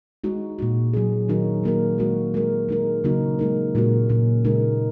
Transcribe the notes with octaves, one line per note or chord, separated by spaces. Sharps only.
G#3 D#4 F#4
A#2 G#3 F#4
F#3 C#4 G#4
D#3 F#3 D#4 F#4 A#4
F#3 A#3 F#4 A#4
G#3 F#4 A#4
G#3 F#4 A#4
G#3 D#4 A#4
C#3 F#3 A#3 D#4 F#4
G#3 D#4 A#4
A#2 G#3 D#4 F#4 A#4
A#2 G#3 C#4
C#3 G#3 D#4 A#4